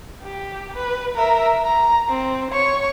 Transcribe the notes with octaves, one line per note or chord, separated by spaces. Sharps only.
G4
B4
A#4 E5
A#5
C4
C#5 C#6